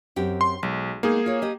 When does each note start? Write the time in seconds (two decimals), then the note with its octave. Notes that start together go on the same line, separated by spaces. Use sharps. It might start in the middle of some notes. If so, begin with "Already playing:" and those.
0.16 F#2 C4 G4
0.41 C6
0.63 B1 G#3
1.03 G#3 A#3 B3 D#4 G#4
1.26 F4 C#5
1.42 G4 D#5